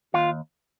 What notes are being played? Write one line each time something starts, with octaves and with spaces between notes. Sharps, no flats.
D#2 F4